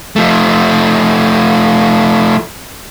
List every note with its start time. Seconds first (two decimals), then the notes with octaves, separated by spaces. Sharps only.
0.16 F3 A3